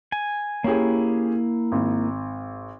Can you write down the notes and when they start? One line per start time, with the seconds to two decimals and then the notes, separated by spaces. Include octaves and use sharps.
0.12 G#5
0.64 A#3 C#4 E4 G4 G#4
1.72 G#1